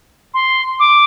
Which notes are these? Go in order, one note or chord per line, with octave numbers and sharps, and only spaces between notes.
C6
D6